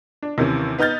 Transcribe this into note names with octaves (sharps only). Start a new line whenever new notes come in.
D4
D#2 C3 E3 C#4
B3 D#4 F6 G6 A6